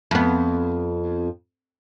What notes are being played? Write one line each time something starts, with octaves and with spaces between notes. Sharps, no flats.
F2 B3